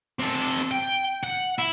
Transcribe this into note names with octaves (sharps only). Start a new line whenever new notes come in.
C3 A4
G5
F#5
E4